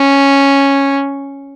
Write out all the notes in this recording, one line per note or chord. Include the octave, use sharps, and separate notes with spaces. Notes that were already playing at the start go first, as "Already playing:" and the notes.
Already playing: C#4